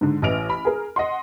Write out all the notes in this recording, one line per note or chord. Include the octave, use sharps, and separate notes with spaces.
G#2 D3
A1 E3 D#5 F6 D7 F7
B5
G#4 A#4
D#5 F#5 C6